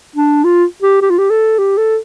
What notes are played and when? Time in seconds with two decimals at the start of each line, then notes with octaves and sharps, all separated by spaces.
0.16 D4
0.44 F4
0.82 G4
1.02 G4
1.10 F4
1.18 G4
1.30 A4
1.58 G4
1.77 A4